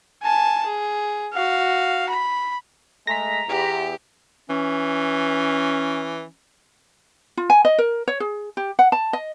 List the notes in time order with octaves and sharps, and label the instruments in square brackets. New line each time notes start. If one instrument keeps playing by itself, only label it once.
[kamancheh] G#5 A5
G#4
F#4 F5
B5
[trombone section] G#3 A3 [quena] A#5 [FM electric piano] A#6 B6
[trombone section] E2 [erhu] G4
[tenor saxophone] E3 [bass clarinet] C#4
[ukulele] F4
G#5
D#5
A#4
C#5
G#4
G4
F#5
A5
D#5